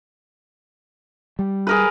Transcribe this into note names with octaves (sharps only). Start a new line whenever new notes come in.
G3
G#4 A#4 B4